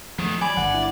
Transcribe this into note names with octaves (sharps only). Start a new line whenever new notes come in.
D#3 F3 A3 B3
F#3 D5 G#5 B5 G#6
G1 D3 F#5
E4